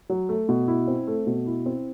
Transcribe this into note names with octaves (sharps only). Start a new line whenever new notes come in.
F#3
A3
B2
E4
C4
A3
B2
E4
C4